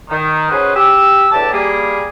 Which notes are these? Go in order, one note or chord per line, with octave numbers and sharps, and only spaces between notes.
D#3
C#4 F#4 G#4 B4 C5 D#5
G4 E6
E2 A2 D4 G4 A5
G3 A#3 G#4